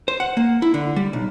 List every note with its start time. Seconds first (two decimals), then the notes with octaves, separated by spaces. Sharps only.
0.08 C5
0.20 F#5
0.37 A#3
0.62 E4
0.74 D3
0.96 G3
1.13 B1